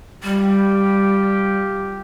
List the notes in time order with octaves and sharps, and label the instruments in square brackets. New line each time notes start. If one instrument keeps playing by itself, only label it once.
[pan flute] G3 [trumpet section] F4 G4